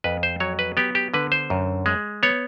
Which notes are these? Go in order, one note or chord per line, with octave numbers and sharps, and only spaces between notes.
F2 B4
C5
F#3 C#5
B4
B3 G4
G4
D3 B4
C5
F#2
G#3
B3 C#5